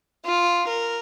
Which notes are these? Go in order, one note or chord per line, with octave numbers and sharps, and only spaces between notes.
F4
A#4